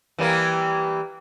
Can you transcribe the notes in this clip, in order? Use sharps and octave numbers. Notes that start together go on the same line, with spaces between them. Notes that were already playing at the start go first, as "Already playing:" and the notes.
E3 G3 A#3